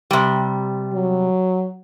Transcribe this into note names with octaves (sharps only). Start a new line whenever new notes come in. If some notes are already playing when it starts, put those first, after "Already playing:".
C3 G3
F#3